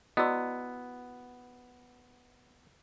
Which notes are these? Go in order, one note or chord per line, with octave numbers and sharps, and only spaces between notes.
B3 E4 F#4 D5 D#5 E6